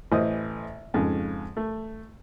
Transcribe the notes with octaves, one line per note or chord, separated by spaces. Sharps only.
A1 E3 C5 D#5 D#6
F2 G#2 C#3
A3